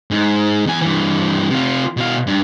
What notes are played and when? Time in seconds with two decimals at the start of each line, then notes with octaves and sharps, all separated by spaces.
0.11 G#2
0.66 E2 G#5
0.82 G2 E3
1.51 C3 F4
1.97 B2 F5
2.27 G2